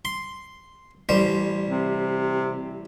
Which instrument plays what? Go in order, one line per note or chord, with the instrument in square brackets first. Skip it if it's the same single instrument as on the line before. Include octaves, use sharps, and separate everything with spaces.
[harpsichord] C6
A1 G3 C5
[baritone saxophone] C3